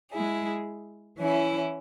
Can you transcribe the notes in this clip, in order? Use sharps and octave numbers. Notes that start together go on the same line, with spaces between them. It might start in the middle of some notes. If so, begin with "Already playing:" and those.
G#3 E4 G#4
E3 C#4 E4